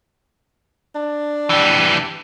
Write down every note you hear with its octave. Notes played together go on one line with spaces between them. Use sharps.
D4
E3 G3